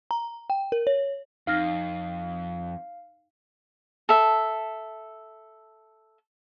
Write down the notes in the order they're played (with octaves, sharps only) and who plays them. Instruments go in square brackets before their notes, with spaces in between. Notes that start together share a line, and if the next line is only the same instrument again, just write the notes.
[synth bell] A#5
G5
A#4
C#5
[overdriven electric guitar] F2 [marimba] D#4 F6 A#6 [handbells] F5
[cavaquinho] A4 E5